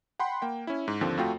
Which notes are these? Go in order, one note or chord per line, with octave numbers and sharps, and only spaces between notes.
F#5 G5 B5 C6
A#3 G5
C#4 E4
G#2
D#2 D3 F3 C4
F2 A3 F4 F#4 G5